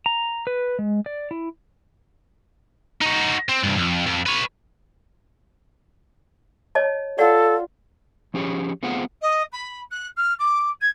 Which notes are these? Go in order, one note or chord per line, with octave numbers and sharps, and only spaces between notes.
A#5
B4
G#3
D5
E4
D#4 F#4
C4
C2 G2
F2
F2
B4 C#5
C#5 D#5 A5
F4 A4 D5 F#5
F3 C#4 G4 G#4 C#5
A3 B3 C4 F4 G#4 F#5
D#5
B5
F#6
F6
D6
G#6